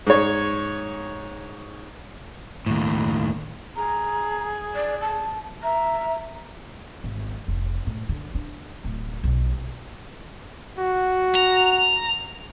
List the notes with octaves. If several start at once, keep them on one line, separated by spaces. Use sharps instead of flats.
G#2 C#5
D#2 A2
G#4 A#5
D5
A5
E5 A#5
G#1
F1
A2
D3
D4
D1
B1
F#4
A#5